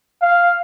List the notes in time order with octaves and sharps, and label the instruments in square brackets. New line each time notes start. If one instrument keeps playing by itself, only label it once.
[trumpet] F5